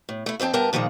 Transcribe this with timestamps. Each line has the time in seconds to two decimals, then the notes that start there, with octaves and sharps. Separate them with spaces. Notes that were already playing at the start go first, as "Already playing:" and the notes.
0.09 A2
0.26 A3 E4
0.40 F2 C4 D4 G5 A5
0.53 G2 B3 A#4 G5 A5
0.73 A#2 D#3 F3 G#3 A#3